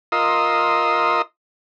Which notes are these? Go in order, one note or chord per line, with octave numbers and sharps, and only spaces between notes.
F4 A#4 D#5 C6 D#6 E6